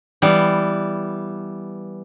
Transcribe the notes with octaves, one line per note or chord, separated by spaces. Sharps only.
E3 G3 B3